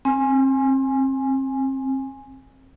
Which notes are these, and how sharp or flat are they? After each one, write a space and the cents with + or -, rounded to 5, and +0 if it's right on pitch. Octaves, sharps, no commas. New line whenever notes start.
C4 +30 G#5 -5